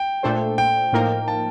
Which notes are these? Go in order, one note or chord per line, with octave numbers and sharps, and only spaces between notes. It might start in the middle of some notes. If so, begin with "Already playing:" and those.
Already playing: G5
A#2 A3 D4 A4 C5
G5
A2 F3 A#3 D#4 A#4
A5